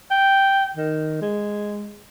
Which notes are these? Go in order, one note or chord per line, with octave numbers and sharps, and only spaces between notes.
G5
D#3
G#3